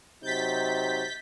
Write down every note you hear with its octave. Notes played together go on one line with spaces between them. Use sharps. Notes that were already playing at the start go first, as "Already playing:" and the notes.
C3 F#3 D#4 G6 A6 B6